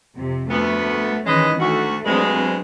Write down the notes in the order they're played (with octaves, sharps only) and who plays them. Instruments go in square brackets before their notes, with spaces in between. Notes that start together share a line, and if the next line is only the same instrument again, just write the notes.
[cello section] F2 C3
[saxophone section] D2 B3 [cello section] A3
[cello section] D#3 E3 C#4 [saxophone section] G#3 B4 D#5
[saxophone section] D2 F#4 [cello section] A3
[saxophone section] G2 B2 G#3 [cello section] F#3 C4 D4